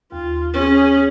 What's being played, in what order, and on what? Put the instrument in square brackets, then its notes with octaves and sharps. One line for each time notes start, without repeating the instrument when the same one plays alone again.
[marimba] D#2 [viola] F4
[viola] C#4 G#4